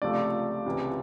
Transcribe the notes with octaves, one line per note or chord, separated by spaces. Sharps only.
C#2 C3 F3 A3 D5
C#2 C3 E3